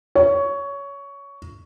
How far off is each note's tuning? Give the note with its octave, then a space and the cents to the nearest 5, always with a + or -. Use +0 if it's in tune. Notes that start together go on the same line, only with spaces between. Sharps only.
C#5 +15